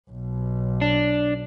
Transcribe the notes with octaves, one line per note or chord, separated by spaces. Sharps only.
B1 B2
D4